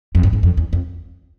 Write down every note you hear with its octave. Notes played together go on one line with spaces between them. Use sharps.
F2
G2
G#2
F2
E2
F2